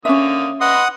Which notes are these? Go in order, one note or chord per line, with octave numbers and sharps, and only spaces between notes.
D3 A#3 C#4 E5 D#6
B4 D#5 F#5 C6 D#6